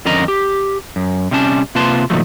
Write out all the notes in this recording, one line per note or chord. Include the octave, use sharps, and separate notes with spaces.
F2 D3 C#4 A#4 D#5 A#5
G4
F#2
C3 G3 C#4 A5
C3 A#3 F4 B4 A5 C6
A#2 D#3 F3 F#3 A3